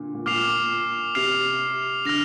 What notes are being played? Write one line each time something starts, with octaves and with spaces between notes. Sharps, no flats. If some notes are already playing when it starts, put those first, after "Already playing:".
Already playing: A#2 D3
A#2
A#2 D6 F6 C7 F7
C3 F6 C7 F7
D3 F6 A#6 F7